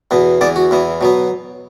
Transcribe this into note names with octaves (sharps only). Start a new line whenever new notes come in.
E2 B2 B3
E2 E3 B3 D5
F#4
E2 E3 B3
B2 F#3 B3